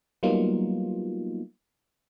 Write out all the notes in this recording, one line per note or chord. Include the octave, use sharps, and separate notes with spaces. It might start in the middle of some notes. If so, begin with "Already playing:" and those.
F#3 G3 A#3 B3 D#4 F4